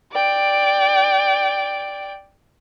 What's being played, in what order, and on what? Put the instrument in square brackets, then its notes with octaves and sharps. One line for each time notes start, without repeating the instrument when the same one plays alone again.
[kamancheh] D5 G5